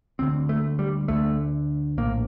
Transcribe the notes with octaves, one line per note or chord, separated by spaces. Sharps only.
D2 D3 C4
A3
G3
D2 D3 A3
A#1 A2 A#3